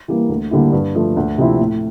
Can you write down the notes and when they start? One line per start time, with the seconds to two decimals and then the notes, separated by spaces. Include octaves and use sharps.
0.08 E3 G3 A#3
0.29 D2
0.51 D3 G3 A#3 E4
0.72 G2
0.95 F3 A3
1.17 D2
1.38 C3 F3 C4 E4
1.60 A2